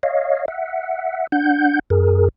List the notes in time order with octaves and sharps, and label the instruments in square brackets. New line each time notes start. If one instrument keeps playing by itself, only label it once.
[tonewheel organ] C#5 D#5 F5
E5 F#5
D4 F#5 G6
F#2 G#4 A#4